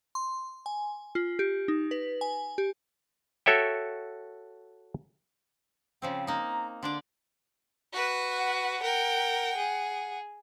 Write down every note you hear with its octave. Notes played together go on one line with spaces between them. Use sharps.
C6
G#5
F4
G4
D#4
B4
G#5
G4
F#4 A4 C#5 E5 G5
C#3 F3 C4 G5
A#3 D#4 A#5
D3 D4 D5 C6
F#4 B4
F#5
A#4 G5
G#4